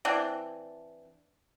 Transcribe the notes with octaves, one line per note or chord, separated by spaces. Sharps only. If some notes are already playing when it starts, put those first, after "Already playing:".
E3 C4 D4